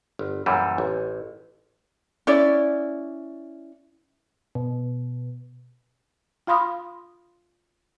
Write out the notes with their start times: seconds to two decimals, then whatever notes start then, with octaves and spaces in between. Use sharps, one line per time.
0.19 G1
0.46 F#2 A#2 E3 G3
0.78 A1
2.27 C#4 E4 D5
4.55 B2
6.47 F4 F5 B5 C6 D#6 F6